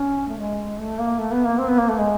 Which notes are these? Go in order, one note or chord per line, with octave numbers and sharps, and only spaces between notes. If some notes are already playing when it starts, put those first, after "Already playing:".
Already playing: C#4
A3
G#3
A3
A#3
A3
B3
A#3
C4
B3
A#3
A3
G#3